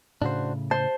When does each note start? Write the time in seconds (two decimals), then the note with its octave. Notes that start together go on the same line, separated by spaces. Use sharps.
0.22 A2 C#3 D4 F#4 C5
0.71 C5 A5